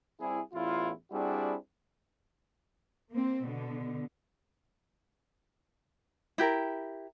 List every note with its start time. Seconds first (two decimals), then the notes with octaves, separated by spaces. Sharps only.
0.20 C2 E4 G#4
0.54 A1 E2 E4 F4
1.12 G3 C4 D4 E4 F#4 G#4
3.11 A#3 C4
3.42 B2 D3
6.38 E4 G4 A#4